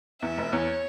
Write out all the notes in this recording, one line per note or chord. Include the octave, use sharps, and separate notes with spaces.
E2 E5
F1
E2 C#5